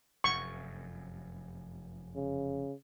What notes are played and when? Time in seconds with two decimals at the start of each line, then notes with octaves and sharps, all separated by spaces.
0.24 F1 F#2 C#6
2.15 C#3